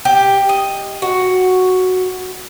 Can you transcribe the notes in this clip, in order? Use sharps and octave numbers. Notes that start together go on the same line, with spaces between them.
G4
D#5
F#4